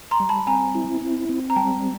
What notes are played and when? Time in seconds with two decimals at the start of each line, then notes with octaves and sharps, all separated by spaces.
0.11 A#5 C6
0.20 G3
0.29 A5 B5
0.47 C4 G#5 A#5
0.75 E4
1.01 C4
1.29 C4
1.50 A#5
1.56 G3 G5 A5